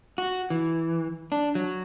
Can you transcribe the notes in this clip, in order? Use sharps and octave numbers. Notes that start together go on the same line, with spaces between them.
F#4
E3
D4
F#3